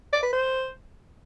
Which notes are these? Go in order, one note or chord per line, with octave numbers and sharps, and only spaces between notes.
D5
B4
C5